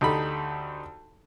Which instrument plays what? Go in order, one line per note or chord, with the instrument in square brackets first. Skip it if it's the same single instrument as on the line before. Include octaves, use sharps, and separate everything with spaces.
[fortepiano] D2 D#4 G4 A4 B5